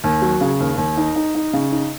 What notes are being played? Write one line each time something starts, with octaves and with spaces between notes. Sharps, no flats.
D#2
F#3
C#3
D#2
D#2
D#4
D#4
D#4
C#3
D#4